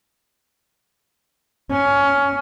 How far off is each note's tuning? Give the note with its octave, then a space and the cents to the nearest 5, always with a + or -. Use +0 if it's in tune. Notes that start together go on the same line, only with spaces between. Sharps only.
C#4 +15